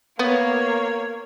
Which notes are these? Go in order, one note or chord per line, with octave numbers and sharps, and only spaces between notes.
A#3 B3 C#5